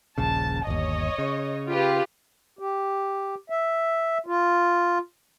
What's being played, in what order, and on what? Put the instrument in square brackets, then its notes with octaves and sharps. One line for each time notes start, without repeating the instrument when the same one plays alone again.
[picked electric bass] D#1 A#1 C#3 [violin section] A5
[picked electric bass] G1 D#2 [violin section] C#5 D#5
[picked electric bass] C#3
[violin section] F4 G4 B4
[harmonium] G4
E5
F4